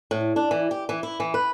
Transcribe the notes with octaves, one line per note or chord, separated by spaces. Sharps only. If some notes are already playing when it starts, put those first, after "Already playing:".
A2
D4
E3
G4
E3
E4
E3
B4